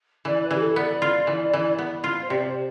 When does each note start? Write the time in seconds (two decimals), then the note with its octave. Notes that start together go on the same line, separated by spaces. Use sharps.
0.25 E3 D5
0.42 B4
0.51 E3 G4
0.59 A4
0.76 B3 D5
1.02 F4
1.27 E3
1.53 E3
1.78 B3
2.04 F4
2.21 C5
2.29 C3 D5
2.46 C5